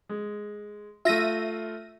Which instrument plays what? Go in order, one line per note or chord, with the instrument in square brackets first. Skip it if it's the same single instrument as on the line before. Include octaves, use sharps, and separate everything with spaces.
[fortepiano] G#3
[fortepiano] A3 F4 [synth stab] E5 A#6 D#7